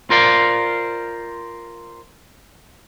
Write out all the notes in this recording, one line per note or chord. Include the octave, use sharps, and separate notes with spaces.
F4 A#4 C5 D5 F5